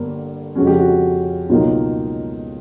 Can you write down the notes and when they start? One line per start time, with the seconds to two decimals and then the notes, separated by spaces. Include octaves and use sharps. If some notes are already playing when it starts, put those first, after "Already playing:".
Already playing: G1 G2 D3 G3 A#3
0.55 F2 C#3 F3 G#3 C#4 F#4
0.67 G4
0.79 F#4
1.49 C#2 B2 F#3 A#3 D#4 F4